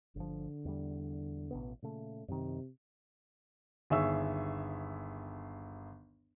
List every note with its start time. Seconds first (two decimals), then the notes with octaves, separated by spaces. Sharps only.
0.16 G1 D3 F3
0.65 E2 G3
1.51 A1 B2 B3
1.82 A#2 C#3 A3
2.28 F#2 C3 D#3
3.90 G1 D#2 G#4 E5 C#6 E6